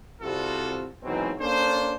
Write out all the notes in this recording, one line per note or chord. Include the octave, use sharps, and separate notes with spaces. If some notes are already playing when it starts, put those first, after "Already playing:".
C2 C3 G3 F4 F#4 A4
G#2 B2 E3 F#3 C4
A#3 C#4 D4 A4 C5